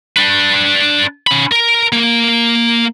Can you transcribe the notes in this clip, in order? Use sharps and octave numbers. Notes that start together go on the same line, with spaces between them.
D4 B4
C#4 B5
A#4
A#3